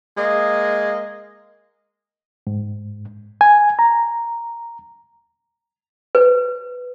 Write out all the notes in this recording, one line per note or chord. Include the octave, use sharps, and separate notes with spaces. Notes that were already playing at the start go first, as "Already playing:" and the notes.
G#3 A#3 D#5
G#2
G#5
A#5
B4